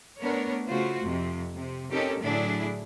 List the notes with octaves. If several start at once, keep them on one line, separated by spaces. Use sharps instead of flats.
A3 B3 D4 A#4 C#5
C#3 A3 F4 F#4 C5
F2 C3
C3
C4 C#4 D#4 G4 A4 A#4
A2 D3 F#3 D4 E4 G#4